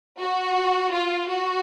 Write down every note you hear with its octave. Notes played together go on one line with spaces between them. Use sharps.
F#4
F4
F#4